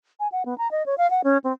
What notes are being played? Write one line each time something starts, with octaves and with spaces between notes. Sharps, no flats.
G#5
F#5
B3
A#5
D#5
C#5
F5
F#5
C#4
C4